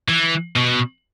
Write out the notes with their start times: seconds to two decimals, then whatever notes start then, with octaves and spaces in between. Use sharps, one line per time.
0.08 E3
0.56 B2